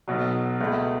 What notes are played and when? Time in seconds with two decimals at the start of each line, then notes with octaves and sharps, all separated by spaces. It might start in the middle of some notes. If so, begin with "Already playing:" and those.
0.08 B1 B2 F#3
0.60 C#2 B2 A3